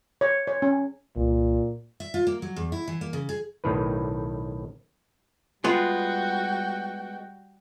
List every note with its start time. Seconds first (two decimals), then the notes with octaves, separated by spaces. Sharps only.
0.21 C#5
0.47 C#5
0.62 C#4
1.16 C2 A#2
2.00 E5
2.14 F4
2.27 A#3
2.42 F#3
2.56 E2
2.72 E4
2.87 E3
3.01 A#3
3.13 C#3
3.29 G#4
3.64 B1 A2 D#3 B4
5.64 G3 G#3 B3 F4 F#4 G5